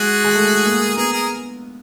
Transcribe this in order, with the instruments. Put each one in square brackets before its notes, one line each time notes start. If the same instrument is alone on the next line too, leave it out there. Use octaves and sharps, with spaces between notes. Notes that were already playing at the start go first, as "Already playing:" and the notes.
Already playing: [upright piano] G#3 [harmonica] F#4 G#4
[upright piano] G#3
A3
A#3
[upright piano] B3 [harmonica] G#4 A#4
[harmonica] G#4 A#4